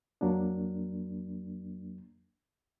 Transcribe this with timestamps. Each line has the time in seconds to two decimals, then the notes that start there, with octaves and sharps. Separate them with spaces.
0.21 F2 F#3 A#3 D4